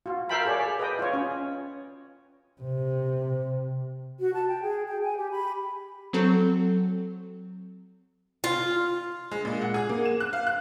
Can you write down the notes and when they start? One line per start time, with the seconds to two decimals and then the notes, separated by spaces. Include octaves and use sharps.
0.06 F4 F#4
0.29 A#4 E5 F5 G5 A5 B5
0.45 G#4 A4 C#5 D5
0.79 B4 D#5 G5
0.99 F4 C#5
1.13 C#4
2.61 C3
4.20 F#4
4.34 A5
4.49 G5
4.63 G#4
4.88 G5
5.03 G#5
5.17 G4
5.31 B5
6.13 F#3 C4 A4
8.44 F4
9.31 G#3
9.45 A#2
9.62 F#5
9.74 G#4
9.89 A#3
10.05 E7
10.20 F#6
10.33 F5
10.47 F#6